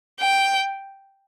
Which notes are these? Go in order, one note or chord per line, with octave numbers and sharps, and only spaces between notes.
G5